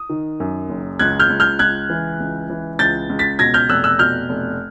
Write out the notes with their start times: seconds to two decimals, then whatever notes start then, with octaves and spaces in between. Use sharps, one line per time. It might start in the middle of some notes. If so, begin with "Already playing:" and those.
Already playing: D#6
0.09 D#3
0.40 F#2
0.69 F#1
0.99 C#2 F#6 G#6
1.19 F6 G6
1.30 C#2
1.40 F6 G6
1.59 C#2 F#6 G#6
1.90 E3
2.20 C#2
2.50 E3
2.79 C#2 G6 A6
3.09 C#2
3.19 A6 B6
3.39 B2 G#6 A#6
3.54 F6 G6
3.69 F1 E6 F#6
3.84 E6 F#6
3.99 B2 F6 G6
4.29 F1